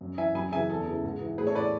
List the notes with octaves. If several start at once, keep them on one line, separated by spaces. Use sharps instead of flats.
F#2
E3 E5 G#5
F#2 G#5 B5
C#3 E3 E5 G#5
E2 A4
C#3 E3
G#2
E3
A2 G#4 B4
A4 C#5
E3 B4 D5